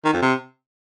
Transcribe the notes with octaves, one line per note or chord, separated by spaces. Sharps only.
D#3
F2
C3